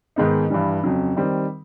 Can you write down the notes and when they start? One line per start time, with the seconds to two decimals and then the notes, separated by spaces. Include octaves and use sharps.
0.16 G#2 D#3 G#3 B3 D#4
0.50 G2 E3 G3
0.84 F2 C#3 F#3
1.16 D#3 G3 C4